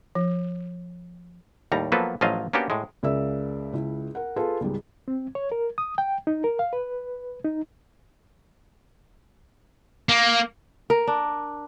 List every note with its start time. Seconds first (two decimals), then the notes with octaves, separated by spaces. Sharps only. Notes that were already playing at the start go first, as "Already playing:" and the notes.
0.15 F3
1.72 D#2 A2 G3 A#5
1.92 F3 F#3 A#3 B3 A4 B4
2.21 A1 F3 F#3 F4 D#5 F5
2.53 A#3 B3 C#4 D4 F#4 G4
2.70 A2 G#3
3.03 C#2 C#3 A#4 D5 E5 E6
3.73 C#2 E4
4.15 A#4 F#5
4.36 F4 G#4 A4 B4
4.61 C#2 G#2 G3
5.08 C4
5.35 C#5
5.52 A#4
5.78 D#6
5.98 G5
6.27 D#4
6.44 A#4
6.59 F5
6.73 B4
7.45 D#4
10.09 A#3
10.90 A#4
11.07 D4